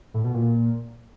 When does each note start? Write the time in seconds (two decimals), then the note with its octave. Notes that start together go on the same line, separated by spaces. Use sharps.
0.14 A2
0.24 B2
0.34 A#2